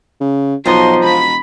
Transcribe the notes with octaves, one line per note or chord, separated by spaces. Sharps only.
C#3
B1 F3 F#4 D#5 A#5 C6
E1 B5 B6